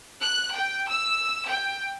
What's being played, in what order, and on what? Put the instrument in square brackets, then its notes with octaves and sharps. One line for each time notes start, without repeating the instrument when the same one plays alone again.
[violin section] F#6
G5
E6
G5